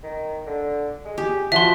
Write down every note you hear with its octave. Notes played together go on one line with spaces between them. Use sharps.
D#3
D3
G#3
G4 G#4
F3 F#4 E5 C6